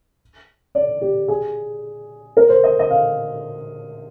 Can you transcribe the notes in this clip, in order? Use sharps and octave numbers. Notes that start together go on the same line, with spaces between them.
D5
G4
G#4
A#4
C5
D#5
D#5
F5